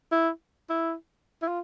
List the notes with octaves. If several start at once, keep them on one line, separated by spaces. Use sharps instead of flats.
E4
E4
E4
F4